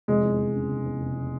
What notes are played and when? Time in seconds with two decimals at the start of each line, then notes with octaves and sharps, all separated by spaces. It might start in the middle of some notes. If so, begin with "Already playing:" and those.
0.08 F1 G#3
0.24 E2
0.39 F1
0.54 C#3
0.71 F1
0.85 E2
1.00 F1
1.16 C#3